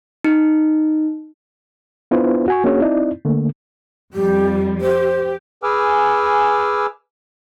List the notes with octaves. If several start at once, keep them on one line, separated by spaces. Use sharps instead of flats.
D#4
B3 D4 E4 F4 B4 C5
F#4 G#5 C#6
A#3 C#4 D4 F#4 G#4 C#5
C4 D#4 E4 D5
D3 A3 A#3
F2 G3 G4
G4 C5
G#4 B4 G#5 D6 E6 F6